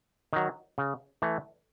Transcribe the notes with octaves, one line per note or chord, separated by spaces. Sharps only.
D#3 F#3
C#3
E3 A3